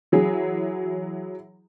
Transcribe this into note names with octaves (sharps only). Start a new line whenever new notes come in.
E3 F#3 G#4